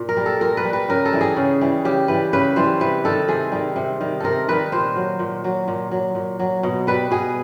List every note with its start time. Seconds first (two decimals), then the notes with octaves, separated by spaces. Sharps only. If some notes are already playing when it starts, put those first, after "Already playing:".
Already playing: A#2
0.09 A#4
0.17 G3
0.26 A4
0.41 A#2 A#4
0.57 B4
0.64 G3
0.73 B4
0.88 C#3 A#4
1.05 A4
1.13 E3 G3
1.21 G#4
1.37 C#3
1.61 E3 G3
1.85 C#3 G4
2.08 E3 G3 B4
2.33 C#3 B4
2.56 E3 G3 C5
2.80 C3 B4
3.04 D#3 G3 A4
3.28 C3 G#4
3.52 D#3 G3
3.76 C3
4.01 D#3 G3
4.20 C3 A4 A#4
4.48 D#3 G3 B4
4.72 A#2 C5
4.96 F#3
5.19 A#2
5.44 F#3
5.68 A#2
5.91 F#3
6.15 A#2
6.39 F#3
6.63 B2
6.87 G3 B4
7.11 B2 G#4